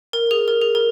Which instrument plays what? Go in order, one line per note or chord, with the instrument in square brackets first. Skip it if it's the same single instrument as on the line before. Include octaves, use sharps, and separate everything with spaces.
[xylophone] A#4
G#4
A#4
G#4
A#4